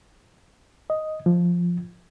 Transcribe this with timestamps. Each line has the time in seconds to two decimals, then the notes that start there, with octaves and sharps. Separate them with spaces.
0.90 D#5
1.26 F3